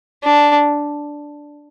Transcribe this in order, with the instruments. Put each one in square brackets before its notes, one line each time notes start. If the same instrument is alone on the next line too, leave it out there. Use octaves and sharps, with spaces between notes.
[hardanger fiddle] D4